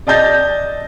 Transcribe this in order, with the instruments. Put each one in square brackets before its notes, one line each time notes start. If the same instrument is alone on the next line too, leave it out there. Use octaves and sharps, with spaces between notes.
[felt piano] D5 D#5 A5 G6 A6 A#6